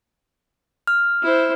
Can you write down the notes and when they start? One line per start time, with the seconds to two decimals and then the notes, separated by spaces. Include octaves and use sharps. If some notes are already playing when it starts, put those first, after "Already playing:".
0.87 F6
1.23 E4 C5